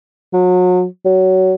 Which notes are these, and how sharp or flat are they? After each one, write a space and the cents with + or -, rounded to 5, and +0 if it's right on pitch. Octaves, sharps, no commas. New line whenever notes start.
F#3 -35
F#3 +20